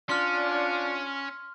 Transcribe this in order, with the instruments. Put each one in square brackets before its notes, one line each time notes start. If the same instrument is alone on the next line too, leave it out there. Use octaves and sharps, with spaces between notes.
[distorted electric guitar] C#4 [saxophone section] D4 F4 [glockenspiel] C6 F6